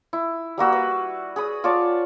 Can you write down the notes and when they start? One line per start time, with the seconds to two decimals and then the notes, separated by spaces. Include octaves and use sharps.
0.13 E4
0.58 G3 A#3 F#4 E6
0.73 B4
1.36 G#4 B5 D#6
1.64 F4 C#5 D5 A5